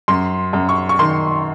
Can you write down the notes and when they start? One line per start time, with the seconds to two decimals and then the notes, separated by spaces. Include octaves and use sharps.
0.08 F#2 C6
0.53 F#2
0.69 C#6
0.89 C#6
0.99 D#3 C6